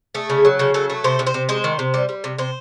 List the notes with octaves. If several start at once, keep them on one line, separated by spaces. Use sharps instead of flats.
A3 G#4
C#3
F#3
C#3 A4
F#3 A4
A3
C3 C5
C3
C5
C3
G#3 C5
D#3
C3
G3
G3
C3
C3 C5